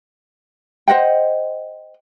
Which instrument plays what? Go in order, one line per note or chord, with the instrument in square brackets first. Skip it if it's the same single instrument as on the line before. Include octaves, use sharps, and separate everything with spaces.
[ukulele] C5 D#5 F#5 G5